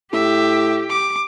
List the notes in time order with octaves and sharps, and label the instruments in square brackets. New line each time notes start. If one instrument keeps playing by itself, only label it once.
[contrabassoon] A2 [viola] G4 [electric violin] E5
[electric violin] D6